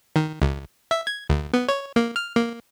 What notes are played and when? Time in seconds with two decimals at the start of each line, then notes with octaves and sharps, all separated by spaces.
0.16 D#3
0.42 C#2
0.91 E5
1.07 G#6
1.30 D2
1.54 B3
1.69 C#5
1.96 A#3
2.16 F6
2.36 A#3